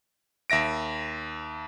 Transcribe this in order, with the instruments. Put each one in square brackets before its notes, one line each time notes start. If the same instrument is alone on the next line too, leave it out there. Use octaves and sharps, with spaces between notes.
[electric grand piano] D#2 E5 A#6 D7